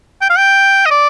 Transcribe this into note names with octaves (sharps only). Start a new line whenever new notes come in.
G5
F5
G5
D#5
D5